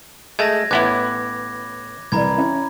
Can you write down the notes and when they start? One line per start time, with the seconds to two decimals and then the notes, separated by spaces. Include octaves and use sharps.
0.39 G#3 A3 G#6 A#6
0.71 A1 B3 E4 C#5 B5 D6 F#6 G#6
2.12 C2 E3 D5 A#5 B5 G#6
2.38 C#4 E4 C#5